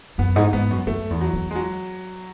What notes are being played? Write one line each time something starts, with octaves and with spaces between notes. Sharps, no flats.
F#2 B3
G#2
G#2 B3
F#2
F#2 A3
E2
F#3
E2
G#3
F#3